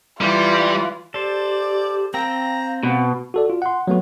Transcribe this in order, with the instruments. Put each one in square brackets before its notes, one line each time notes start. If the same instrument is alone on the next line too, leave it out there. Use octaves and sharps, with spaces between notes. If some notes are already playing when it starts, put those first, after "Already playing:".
[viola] E3 [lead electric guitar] G3 [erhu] F4
[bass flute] G4 [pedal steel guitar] A4 C5 [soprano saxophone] D5
[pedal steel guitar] C4 G5 E6 [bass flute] F5 [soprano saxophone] A#5
[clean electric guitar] B2
[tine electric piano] F#4 A4 D5
F4
F#5 C6
F#3 A3 B3 F#4